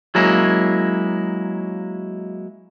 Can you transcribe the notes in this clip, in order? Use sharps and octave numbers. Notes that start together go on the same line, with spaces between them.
F#3 G#3 A#3 C#4 E4